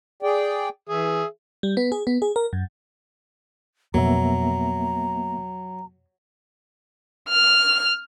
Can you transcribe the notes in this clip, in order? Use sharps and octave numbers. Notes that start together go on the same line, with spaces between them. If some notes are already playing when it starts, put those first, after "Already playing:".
G#4 D5 G5
E3 G#4 E5
G3
B3
G#4
B3
G#4
A#4
F#2
F2 B2 F#3 A#3 B3 E5 A#5
F6